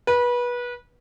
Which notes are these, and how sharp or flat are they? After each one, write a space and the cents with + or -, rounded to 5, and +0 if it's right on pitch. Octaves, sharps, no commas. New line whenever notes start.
B4 -25